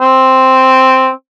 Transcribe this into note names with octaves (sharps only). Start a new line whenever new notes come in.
C4